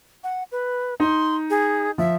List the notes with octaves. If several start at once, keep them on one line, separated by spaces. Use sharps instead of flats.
F#5
B4
D#4 C6
G#4
F3 E5